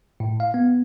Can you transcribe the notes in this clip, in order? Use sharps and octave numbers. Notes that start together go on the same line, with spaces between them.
A2
F5
B3